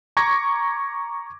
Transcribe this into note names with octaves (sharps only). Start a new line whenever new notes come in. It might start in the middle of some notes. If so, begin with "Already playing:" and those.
A#5 C#6 D6 G#6 A#6